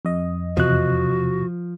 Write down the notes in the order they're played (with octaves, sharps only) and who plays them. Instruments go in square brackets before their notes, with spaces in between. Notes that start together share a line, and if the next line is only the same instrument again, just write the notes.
[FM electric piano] F2 D#5
[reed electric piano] E2 C3 F#6 [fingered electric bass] F3 [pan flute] F#4